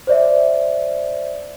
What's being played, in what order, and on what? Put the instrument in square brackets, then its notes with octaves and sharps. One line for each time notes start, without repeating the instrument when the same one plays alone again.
[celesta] C5 D5 E5